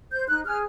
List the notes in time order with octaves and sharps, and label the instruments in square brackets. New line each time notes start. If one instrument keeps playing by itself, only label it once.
[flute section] C5 G6
D#4 F#6
G#4 F6